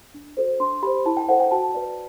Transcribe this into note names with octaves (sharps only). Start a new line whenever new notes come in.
D4
F#4 A4 C5
D4 C6
G4 C5 B5
E4 A5
G5
A4 C5 F#5
G5
F#4 A5
B4 D5